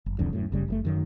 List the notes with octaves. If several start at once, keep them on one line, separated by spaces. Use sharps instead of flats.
F#1
D1 C2 F2 D3
F#2 A2
F#1 C#3 G3
F#1 D3 A3
F#2 D#3 F#3